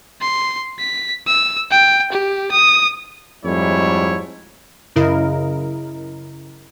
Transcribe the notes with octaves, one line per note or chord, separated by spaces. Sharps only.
C6
B6
E6
G5
G4
D#6
F2 G#2 G3 A3 E4 C#5
F#2 C#3 E4 A#4 D#5